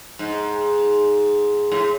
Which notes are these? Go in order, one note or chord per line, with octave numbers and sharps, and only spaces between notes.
G#2
A2